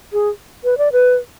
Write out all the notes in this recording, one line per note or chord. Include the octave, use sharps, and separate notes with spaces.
G#4
B4
D5
B4